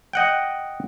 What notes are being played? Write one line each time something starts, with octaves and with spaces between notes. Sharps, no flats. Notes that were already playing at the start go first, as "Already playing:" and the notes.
D#5 F#5 G5